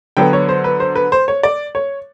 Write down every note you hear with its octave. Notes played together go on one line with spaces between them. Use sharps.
D3 F#3 B3 G5
C#5
C5
B4
C5
B4
C5
C#5
D5
C#5